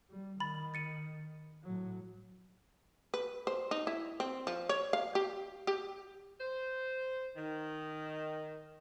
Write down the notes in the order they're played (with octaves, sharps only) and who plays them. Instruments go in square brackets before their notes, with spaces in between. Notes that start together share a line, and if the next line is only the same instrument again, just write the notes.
[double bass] G3
[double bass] D#3 [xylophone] B5 A6
[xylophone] A6 C#7 D#7
[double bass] A2 F#3
[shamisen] B4
C5
D#4
E4
C4
F3
C#5
F5
G4
G4
[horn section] C5
D#3